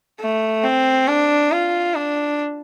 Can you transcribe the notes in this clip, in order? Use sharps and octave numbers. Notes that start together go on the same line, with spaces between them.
A3
C4
D4
F4
D4